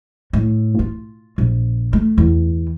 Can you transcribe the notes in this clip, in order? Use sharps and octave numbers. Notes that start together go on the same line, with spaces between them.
A2
F4
A#1
A3
E2